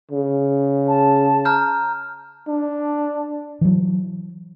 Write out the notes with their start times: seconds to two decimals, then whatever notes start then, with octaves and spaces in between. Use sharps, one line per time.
0.11 C#3
0.88 A5
1.45 A#5 F6 G6
2.48 D4
3.61 E3 F#3